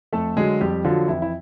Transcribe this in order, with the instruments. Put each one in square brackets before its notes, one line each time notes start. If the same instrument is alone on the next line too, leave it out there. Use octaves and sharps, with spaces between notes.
[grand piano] F2 A3 A4
D3 F#3 G#3 G#4
F2 G3 G4
D3 F3 F#3 F4
F2 E3 E4
E4